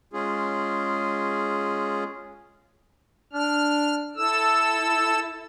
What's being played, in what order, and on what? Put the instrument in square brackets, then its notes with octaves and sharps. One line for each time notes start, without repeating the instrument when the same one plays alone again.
[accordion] G#3 C#4 F4 G#4
[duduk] D4 [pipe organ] F6
[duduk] E4 [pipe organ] A4 E6